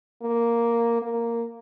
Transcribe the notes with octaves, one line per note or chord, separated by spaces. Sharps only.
A#3
A#3